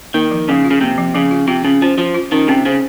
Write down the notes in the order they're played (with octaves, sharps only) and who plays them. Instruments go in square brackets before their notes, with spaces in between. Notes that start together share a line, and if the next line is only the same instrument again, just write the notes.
[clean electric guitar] D#3 [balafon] A#3
[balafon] F3
[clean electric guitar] C#3 [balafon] F3
[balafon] F4
[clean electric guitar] C#3
[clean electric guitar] C3 [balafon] A#3
[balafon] F3
[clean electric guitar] C#3 [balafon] F3
[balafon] F4
[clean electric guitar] C3 [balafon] F4
[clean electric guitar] C#3 [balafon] C#4
[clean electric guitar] F3 [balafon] C#4
[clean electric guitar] F3 [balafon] C5
[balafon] F4
[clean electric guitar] D#3 [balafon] C#4
[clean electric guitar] C3 [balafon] C#4
[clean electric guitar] C#3 [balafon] C5